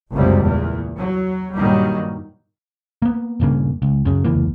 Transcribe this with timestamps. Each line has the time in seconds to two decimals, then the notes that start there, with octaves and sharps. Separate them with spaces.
0.12 F#1 C#2 F#2 C3 G3
0.40 E2 A#2
0.97 F#3
1.54 G2 A#2 D#3 F#3 G3
3.02 A#3 B3
3.40 D#1 G2 C#3 A#3
3.82 C#2
4.05 F#2 C#3
4.25 F1 C#2 E3 A#3